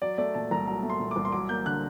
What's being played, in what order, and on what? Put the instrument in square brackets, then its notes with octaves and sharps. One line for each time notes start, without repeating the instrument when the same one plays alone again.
[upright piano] F#3 D5
A3 D5
A#2 A5
C2 A#5
F#3 A#5
A3
C6
A#2
C2 D6
C6
F#3 D6
A#3 G6
D3 F#6